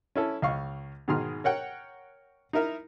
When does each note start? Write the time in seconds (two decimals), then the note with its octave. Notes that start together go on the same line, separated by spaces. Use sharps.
0.16 C#4 E4 A4
0.42 C#2 F5 C#6
1.08 G#2 B2 D#3 G#4 C6 F6
1.44 A#4 C#5 F#5 G5
2.53 D#4 E4 A#4 E5